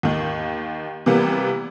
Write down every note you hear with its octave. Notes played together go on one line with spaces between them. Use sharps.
D#2 D#3
C3 E3 G3 A#3 B3